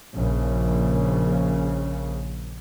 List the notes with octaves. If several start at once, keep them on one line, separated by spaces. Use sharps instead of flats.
A#1 C#3